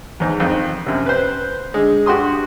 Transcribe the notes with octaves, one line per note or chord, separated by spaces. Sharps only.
E2 G#2
F2 D#3
F#2 C3
B4 C5
D3 G#3
G2 F#4 G4 C6 D#6